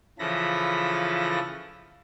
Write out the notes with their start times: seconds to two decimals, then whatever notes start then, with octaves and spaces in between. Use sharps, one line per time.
0.19 C#3 E3 F3 A4 B5 A#6